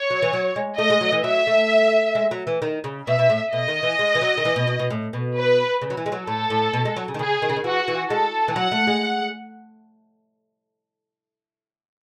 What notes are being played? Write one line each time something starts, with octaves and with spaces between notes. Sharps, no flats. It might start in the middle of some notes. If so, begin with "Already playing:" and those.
Already playing: C#5
F#3
E3
F#3
G#3
A3 D#5
G#3
F#3
E3
F#3 E5
A3
G#3
F#3
E3
D#3
C#3
B2 E5
B2
A2
B2 D#5
D#3
E3
G#3
E3
F#3
D#3
E3
B2
B2
B2
A2
B2
B4
C#3
F#3
E3
G#3
F#3
A2 A4
A2
B2
G#3
F#3
C#3
D#3
C#3 G#4
D#3
C#3
D#3
E3 F#4
E3
G#3 A4
E3
F#3 F#5
A3
G#3